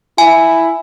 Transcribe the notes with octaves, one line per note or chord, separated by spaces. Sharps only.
E4 G#5